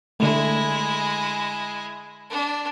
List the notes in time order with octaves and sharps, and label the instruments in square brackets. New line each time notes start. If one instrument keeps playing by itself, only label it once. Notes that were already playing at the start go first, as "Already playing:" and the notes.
[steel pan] D3 A3 [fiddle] G#3 E4
[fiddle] D4